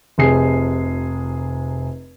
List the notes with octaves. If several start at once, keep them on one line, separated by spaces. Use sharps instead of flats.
F1 C3 G#4 C7